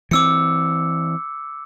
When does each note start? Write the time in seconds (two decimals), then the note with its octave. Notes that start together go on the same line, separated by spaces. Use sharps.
0.11 E3 C4 D6 E6 C#7